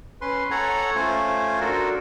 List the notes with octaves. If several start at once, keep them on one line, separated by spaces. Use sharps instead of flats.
C#4 B4 C6
A4 C#5 F#5 G#5 A#5
A3 C#4 F4 C5 G#5
D4 F#4 A4 A#4